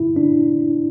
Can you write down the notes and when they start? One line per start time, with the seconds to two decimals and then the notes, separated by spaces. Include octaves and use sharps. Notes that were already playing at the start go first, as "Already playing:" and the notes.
Already playing: E4
0.16 D4